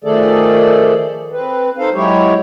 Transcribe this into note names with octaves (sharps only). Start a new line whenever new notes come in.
D#3 F3 A3 G#4 A4 D5
C4 B4
D#4 A4 C5 F5
F#3 G#3 E4 G4 C#5